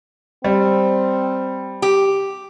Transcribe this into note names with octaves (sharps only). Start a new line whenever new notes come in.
G3 C4
G4